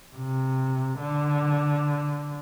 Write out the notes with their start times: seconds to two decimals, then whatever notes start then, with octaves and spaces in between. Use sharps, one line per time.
0.15 C3
1.00 D3